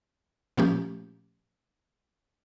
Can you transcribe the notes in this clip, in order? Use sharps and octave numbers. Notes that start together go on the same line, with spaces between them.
A#2 F3 A3 A#3 C#4 G4